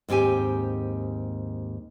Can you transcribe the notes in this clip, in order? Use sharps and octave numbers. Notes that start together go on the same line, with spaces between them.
D#2 G#2 C4 G4 G#5